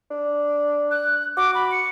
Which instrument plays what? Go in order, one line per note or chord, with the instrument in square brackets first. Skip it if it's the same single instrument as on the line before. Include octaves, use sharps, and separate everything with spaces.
[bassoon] D4
[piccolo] F#6
[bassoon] F#4 [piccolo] D6
[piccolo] B5
C#7